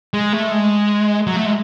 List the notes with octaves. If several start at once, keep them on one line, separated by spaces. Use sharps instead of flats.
G#3
A3
G#3
F#3
A3
G#3